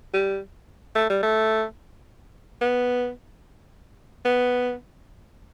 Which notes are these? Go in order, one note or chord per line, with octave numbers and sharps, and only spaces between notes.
G3
A3
G3
A3
B3
B3